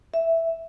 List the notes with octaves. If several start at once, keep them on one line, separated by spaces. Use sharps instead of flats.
E5